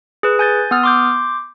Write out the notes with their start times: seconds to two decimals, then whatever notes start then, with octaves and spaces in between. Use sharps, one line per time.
0.23 G#4 B4
0.39 G#5 G6 A6
0.71 B3 D#6 F6
0.83 C6 D6 G6